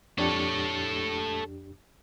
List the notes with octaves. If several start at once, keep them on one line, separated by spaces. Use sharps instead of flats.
F2 D4 G4 A4 C#5